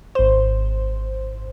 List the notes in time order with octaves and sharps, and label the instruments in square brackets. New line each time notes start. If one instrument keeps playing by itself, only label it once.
[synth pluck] G#1 C5